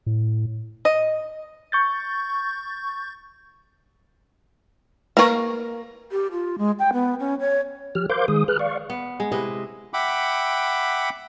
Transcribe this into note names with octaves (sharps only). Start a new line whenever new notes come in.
A2
D#5
C#6 G6 A6
A#3 A#4 B4 C#6
G4
F4
G#3
G5
B3
C#4
C#5
F3 G4 F6
A#4 C5 F5 C6 D6 G6
D#3 G#3 G#4 D#6
G#4 B4 F6 F#6
D5 F5 C#6
B3
G#3
C3 E4 B4 D#5
E5 F#5 G5 B5 D6